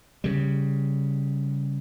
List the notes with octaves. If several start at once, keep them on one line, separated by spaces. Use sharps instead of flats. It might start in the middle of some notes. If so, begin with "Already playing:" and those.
C#3 G3